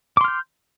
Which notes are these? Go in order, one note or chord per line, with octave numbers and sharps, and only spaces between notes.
C6 D6 F6 G6